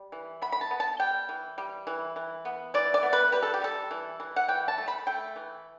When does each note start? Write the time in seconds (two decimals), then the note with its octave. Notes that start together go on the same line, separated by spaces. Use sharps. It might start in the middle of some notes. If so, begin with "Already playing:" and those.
Already playing: G3
0.12 E3
0.42 B3 B5
0.52 B5
0.61 A5
0.71 B3
0.80 A5
1.00 G3 G5
1.29 E3
1.58 G3
1.87 E3
2.16 E3
2.45 B3
2.74 E3 D5
2.94 D5
3.03 B3
3.13 B4
3.32 G3 B4
3.43 A4
3.54 G4
3.61 G3 A4
3.91 E3
4.20 E3
4.36 F#5
4.48 E3 G5
4.68 A5
4.78 A3
4.88 B5
5.07 A3 G5
5.36 E3